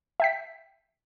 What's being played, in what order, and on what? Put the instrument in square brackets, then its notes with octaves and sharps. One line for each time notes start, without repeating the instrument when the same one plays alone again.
[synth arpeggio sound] E5 G5 B6